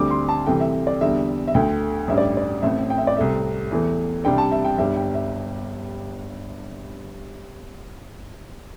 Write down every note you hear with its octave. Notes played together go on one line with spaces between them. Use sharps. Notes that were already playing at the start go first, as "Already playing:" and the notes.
Already playing: D2 D3 G3 C4 D6
C6
A5
C2 C3 E3 A3 G5
E5
D5
E2 D3 G3 E5
E5
D2 D3 A3 G5
A1 G2 G3 E5
D5
D5
A1 A2 A3 C4 E5
G5
E5
D5
C2 C3 A3 C4 E5
E2 E3 A3
C2 C3 G3 D4 G5
A5
E5
G5
G1 G2 G3 E5
G5
E5